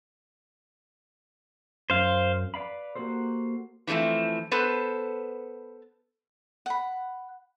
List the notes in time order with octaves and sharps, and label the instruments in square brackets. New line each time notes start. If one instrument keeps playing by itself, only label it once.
[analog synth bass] F#2 [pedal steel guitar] C5 F5
[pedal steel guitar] B4 D5 F5 B5
A#3 F#4 G4 A4 C5
[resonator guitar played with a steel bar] E3 F3 G3 A3 C4
B3 A4 B4 C5
[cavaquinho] F#5 B5